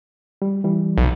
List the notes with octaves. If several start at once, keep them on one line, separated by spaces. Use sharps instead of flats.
G3
E3 G3
B1